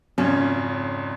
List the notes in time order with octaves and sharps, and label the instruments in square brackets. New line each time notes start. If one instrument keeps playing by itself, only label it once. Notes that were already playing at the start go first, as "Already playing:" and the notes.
[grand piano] G#1 F2 C#3 [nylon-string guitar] C#4